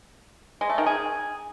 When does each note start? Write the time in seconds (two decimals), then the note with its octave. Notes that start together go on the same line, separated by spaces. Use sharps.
0.61 G#3
0.69 A3
0.78 D#3
0.86 G#4